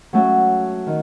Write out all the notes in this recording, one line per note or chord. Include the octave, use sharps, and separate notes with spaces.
F#3 A3 C#4 F#4
D#3